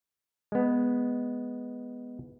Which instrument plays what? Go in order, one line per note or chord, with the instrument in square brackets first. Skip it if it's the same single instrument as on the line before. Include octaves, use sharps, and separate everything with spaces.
[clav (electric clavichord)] G#3 B3